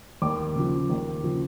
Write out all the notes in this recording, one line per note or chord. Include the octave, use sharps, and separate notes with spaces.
D#2 D6
C#3 F3
D#2
C#3 F3